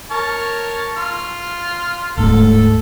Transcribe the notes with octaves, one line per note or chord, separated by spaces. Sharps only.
A#4 C#5 A5
F4 F6
D1 G#2 A3 A4